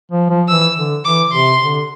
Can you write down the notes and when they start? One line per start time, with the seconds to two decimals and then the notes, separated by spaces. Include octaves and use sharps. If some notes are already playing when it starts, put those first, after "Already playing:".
0.12 F3
0.30 F3
0.48 E3 E6
0.76 D3
1.04 E3 D6
1.32 C3 C6
1.61 D3